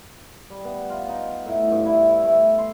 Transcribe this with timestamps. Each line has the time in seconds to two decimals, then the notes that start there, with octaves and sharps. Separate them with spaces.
0.50 G3
0.65 B3
0.90 F4
1.09 D#4
1.46 A2
1.71 G2
1.85 E4
2.08 E4
2.25 A3
2.59 C6